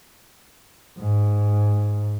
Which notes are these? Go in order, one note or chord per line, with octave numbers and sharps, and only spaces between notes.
G#2